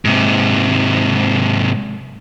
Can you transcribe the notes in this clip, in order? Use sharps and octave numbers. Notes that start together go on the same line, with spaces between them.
G#2 C3